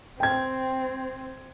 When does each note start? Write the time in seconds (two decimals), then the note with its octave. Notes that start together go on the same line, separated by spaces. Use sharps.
0.20 C4 G5 G#6